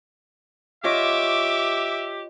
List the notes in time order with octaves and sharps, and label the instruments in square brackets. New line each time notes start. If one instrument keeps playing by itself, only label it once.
[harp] F4 C#5 D#5 [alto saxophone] G4 [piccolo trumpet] E5 [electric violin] D6